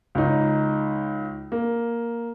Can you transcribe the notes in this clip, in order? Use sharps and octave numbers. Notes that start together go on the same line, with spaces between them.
C#2 D#4
A#3